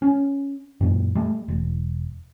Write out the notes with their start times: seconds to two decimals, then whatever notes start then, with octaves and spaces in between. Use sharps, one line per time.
0.02 C#4
0.81 F#2 A#2
1.15 G3 A3
1.48 E1